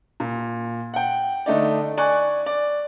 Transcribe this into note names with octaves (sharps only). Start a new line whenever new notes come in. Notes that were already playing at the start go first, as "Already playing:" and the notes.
A#2
F#5 G5
D3 A3 D#4 D5
D5 G#5 C#6 F#6
D5